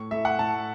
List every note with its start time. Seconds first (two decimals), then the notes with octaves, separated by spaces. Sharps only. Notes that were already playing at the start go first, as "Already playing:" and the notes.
Already playing: A2 C#6
0.11 A3 E4 E5
0.25 F#5
0.38 A2 A5